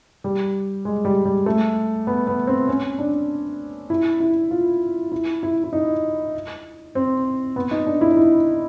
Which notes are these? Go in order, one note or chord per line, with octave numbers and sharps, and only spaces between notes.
G3
G#3
G3
G3
A3
B3
B3
C4
C#4
D4
E4
E4
F4
E4
E4
E4
D#4
C4
B3
D#4
D4
E4
D#4
E4